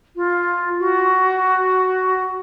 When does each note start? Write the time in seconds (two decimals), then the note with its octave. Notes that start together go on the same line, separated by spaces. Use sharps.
0.16 F4
0.79 F#4